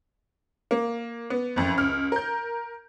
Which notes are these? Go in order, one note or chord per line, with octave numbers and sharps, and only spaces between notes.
A#3
B3
F#1 F2
C#2 F6
A#4 G6